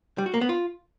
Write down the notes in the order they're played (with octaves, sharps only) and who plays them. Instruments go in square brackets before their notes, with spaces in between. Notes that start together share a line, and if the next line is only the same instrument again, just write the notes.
[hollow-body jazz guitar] G3
F#4
A#3
B3
F4